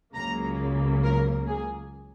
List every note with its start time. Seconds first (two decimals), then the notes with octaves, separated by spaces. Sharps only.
0.14 C#2 C#3 F#3 A#3 A#5
1.03 A#4
1.47 G#4